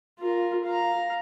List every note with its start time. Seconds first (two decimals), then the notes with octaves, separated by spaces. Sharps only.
0.20 F4 A#4
0.65 F5 A#5